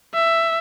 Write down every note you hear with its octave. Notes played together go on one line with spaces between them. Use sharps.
E5